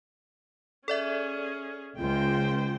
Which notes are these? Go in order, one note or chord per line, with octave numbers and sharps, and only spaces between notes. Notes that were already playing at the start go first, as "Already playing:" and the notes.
C#4 G#4 A4 D5 E5
C#2 F4 C5 G5